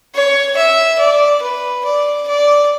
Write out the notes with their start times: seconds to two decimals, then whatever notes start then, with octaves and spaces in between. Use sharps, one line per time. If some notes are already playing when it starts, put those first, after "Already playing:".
0.14 C#5
0.57 E5
0.99 D5
1.42 B4
1.85 D5
2.27 D5